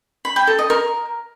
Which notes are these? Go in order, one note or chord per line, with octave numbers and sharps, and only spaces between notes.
B5
G5
A4
D#5
A#4